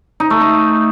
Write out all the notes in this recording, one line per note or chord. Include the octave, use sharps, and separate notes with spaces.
D#4
A3
D#4